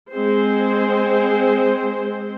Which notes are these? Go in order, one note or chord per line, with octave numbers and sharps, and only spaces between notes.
G#3 C4 G#4 C5